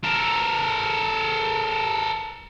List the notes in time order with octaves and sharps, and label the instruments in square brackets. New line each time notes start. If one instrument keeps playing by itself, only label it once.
[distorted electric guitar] A4 A#4